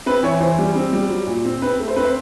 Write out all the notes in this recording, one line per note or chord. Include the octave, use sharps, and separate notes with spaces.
C4 B4
E3 C#5
E3 C5
G3
C4
G3
F#3
A#2
C4
C4 B4
A3
C5
C4 B4
C5